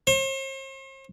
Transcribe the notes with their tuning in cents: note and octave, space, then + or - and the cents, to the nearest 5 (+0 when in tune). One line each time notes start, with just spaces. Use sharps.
C5 +45